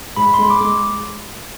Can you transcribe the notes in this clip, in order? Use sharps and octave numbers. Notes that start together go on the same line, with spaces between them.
G#2 B5
G#3 C6
D6
G#3